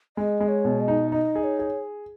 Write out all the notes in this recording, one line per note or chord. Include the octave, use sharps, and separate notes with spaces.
G#3 D#5
G#3
C#5
B2
D#5
D#4
D#4 D#5
G#4
C#5
G#4